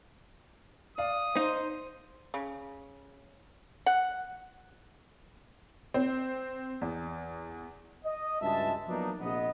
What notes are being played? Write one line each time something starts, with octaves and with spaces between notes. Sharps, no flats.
D5 F5 D#6
D#4 C5
C#3
F#5
C4
E2
D#5
C#2 G2 G#3 F#4 E5 A5
F3 F#3 A#3 B3 D4 D#4
A#1 C3 B3 D#5